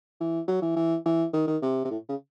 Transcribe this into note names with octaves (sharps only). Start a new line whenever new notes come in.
E3
F#3
E3
E3
E3
D#3
D#3
C3
C3
A2
C#3